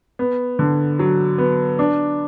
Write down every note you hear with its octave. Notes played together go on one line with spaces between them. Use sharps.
B3
D3
F#3
B3
D4